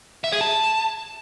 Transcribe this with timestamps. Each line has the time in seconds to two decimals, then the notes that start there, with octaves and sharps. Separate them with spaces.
0.24 E5
0.32 G#4
0.41 A5